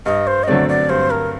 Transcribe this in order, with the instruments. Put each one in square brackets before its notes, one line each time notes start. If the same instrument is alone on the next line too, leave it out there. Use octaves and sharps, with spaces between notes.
[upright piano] G2 [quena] D#5
[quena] C5
D#5
[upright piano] D3 F#3 A3 C4 [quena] D5
[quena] D5
[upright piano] G2 [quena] C5
[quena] A#4